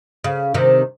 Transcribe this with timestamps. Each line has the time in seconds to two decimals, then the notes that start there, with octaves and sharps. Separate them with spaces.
0.24 C#3
0.54 C3 D#3